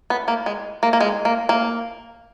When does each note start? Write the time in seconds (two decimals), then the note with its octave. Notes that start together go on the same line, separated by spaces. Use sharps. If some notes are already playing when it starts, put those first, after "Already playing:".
0.10 B3
0.28 A#3
0.46 G#3
0.83 A#3
0.93 A#3
1.01 G#3
1.25 A#3
1.49 A#3